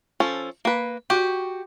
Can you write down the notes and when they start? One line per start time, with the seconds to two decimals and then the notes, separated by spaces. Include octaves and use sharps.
0.20 F3 C#4 A4
0.65 A#3 B4
1.10 F#4 G4